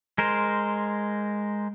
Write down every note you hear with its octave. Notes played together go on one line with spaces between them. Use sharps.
G#3 A#4 C5